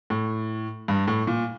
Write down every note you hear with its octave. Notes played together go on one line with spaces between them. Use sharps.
A2
G2
A2
A#2